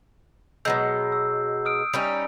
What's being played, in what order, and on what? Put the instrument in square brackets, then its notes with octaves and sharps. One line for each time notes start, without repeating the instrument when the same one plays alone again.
[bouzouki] B2 F#3 G#3 [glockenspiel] E6 G6 C7
[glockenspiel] E6
D#6 F6 D7
[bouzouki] G3 C#4 D#4